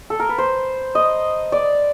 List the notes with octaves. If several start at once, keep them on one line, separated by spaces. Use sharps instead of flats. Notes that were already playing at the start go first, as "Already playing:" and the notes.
A4
A#4
B4
C5
D#5
D5